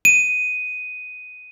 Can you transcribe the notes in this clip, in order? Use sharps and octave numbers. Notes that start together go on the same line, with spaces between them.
D#7